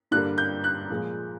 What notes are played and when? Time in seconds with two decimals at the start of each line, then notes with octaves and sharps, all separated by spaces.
0.11 G2 D3 G3 A#3 F#6
0.38 G6
0.64 F#6
0.90 A#2 F3 G#3